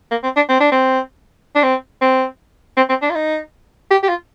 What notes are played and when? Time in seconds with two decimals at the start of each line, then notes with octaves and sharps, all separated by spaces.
0.11 A#3
0.23 C4
0.36 D4
0.49 C4
0.60 D4
0.71 C4
1.55 D4
1.63 C4
2.01 C4
2.77 C4
2.89 C4
3.02 D4
3.10 F4
3.15 D#4
3.91 G4
4.03 G4
4.09 F4